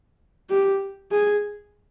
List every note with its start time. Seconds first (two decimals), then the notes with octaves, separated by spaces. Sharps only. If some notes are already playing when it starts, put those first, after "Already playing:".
0.50 G4
1.11 G#4